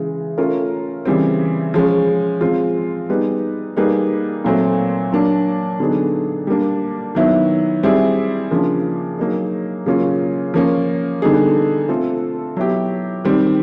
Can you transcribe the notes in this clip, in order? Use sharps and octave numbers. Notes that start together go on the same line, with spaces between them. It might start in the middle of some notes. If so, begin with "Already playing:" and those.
Already playing: C#3 E3 G#3
A3 C#4 F4 A#4
C#3 E3 G3 C4
F3 G#3 C#4
F3 G#3 C4 F4
G3 B3 D#4 G#4 B4
G3 A#3 D#4 G#4 B4
A#2 F#3 A3 C4
F#3 A#3 D4
D3 F#3 B3 D#4 G#4
G3 A#3 D4
D#3 F#3 B3 E4
G3 C4 E4 G#4
C#3 F3 A#3 D4 F4
F#3 A#3 D#4 G#4
C#3 F#3 A#3 C#4 F4
F3 A#3 C#4
D3 G3 B3 D#4 G#4
A3 C4 F4 A4
F#3 B3 E4 G4
D#3 G3 C4